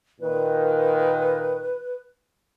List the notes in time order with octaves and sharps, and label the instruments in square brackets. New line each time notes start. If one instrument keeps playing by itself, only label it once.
[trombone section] A#2 D#3 [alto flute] B4